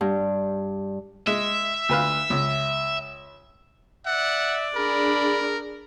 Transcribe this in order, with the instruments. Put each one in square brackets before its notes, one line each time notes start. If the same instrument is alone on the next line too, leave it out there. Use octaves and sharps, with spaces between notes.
[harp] G2
[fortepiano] G#3 [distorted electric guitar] E5
[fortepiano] D2 B4 F5
C#2
[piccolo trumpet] D5 [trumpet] E5 [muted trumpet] F#5
[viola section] D4 G#4 [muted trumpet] A#4 [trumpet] B5